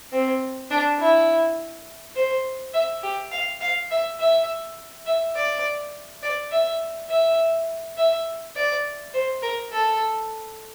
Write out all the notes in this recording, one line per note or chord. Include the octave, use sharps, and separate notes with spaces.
C4
D4
E4
C5
E5
G4
F5
F5
E5
E5
E5
D5
D5
E5
E5
E5
D5
C5
A#4
A4